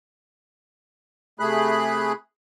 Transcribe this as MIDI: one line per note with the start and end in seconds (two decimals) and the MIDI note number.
1.40 2.12 48
1.40 2.12 57
1.40 2.12 68
1.40 2.12 83
1.40 2.12 90